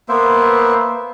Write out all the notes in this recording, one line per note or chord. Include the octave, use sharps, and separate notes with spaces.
A#3 B3 C5 E5